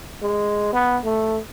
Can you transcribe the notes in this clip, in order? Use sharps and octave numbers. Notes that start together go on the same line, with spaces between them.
G#3
B3
A3